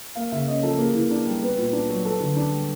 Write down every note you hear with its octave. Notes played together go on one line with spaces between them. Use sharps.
A#3 F5
C#3 E5
C#4 D#5
F3 A4
A#3 G#4
E3
D4
G3
B3
A#2
D4
F#3
B3 A4
D3
D4
G3